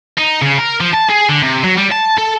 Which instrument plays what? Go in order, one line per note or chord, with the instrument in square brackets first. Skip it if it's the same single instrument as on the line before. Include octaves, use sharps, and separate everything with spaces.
[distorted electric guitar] D#4
C#3
A#4
F3
A5
G#4
D3
C3
F#3
G3
A5
A4